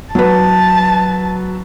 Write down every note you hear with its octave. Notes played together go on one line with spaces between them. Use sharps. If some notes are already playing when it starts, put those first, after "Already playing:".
F#3 B4 A5